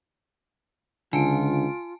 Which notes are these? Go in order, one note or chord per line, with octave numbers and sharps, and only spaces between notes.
C#2 D3 F4 G#5 A5 D7